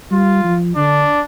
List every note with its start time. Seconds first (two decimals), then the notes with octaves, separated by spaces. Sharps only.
0.11 G3 F4
0.44 F3
0.76 D3 D4